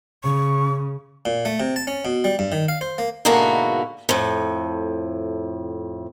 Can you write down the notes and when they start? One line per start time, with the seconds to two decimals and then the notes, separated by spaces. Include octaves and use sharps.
0.23 C#3 C#6
1.25 A#2
1.45 A3
1.60 C3
1.76 A5
1.87 C#4
2.05 B2
2.24 G3
2.39 G2
2.52 D#3
2.68 F5
2.81 C5
2.98 A#3
3.25 G#2 B2 D3 A#3 E4 F#4
4.09 F2 A2